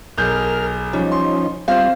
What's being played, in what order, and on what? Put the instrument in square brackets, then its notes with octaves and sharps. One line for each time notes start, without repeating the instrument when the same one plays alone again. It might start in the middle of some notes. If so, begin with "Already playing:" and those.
[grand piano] B1 G#4 G6 [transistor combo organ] A#4 F6
[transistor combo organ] F3 C#4 D#4 [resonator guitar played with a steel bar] G3
[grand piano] C6
[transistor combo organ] G3 F4 [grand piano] C4 [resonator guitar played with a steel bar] C5 F5